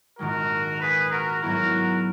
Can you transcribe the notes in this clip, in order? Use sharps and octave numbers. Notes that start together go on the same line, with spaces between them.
A#1 G#2 D#3 G#3 F#4 A#4
G#4 B4
F#4 A#4
G#2 F#3 B3 E4 F#4 A#4